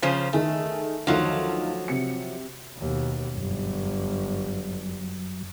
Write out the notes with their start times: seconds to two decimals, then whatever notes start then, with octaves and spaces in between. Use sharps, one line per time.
0.02 C#3 F3 C#4 C5
0.33 D#3 A3 G#4
1.07 D2 D#3 F3 F#3 F4
1.88 C3 C#7
2.78 D#2 B2
3.36 G1 F#2